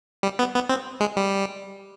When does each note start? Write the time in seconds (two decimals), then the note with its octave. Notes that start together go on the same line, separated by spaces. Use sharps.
0.23 G3
0.39 B3
0.55 B3
0.69 C4
1.01 G#3
1.17 G3